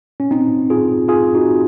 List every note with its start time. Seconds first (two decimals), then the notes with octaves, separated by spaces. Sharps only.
0.20 C#4
0.31 C4 D#4
0.70 F4 G#4
1.08 F4 G#4
1.35 D#4 F#4